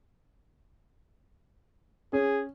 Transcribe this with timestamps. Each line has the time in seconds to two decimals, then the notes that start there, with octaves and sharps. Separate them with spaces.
2.13 C#4 G#4